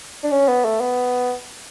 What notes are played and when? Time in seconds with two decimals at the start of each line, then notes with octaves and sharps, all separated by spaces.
0.23 D4
0.31 C#4
0.48 B3
0.65 A3
0.81 B3